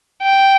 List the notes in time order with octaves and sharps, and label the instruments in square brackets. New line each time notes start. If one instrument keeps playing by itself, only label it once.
[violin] G5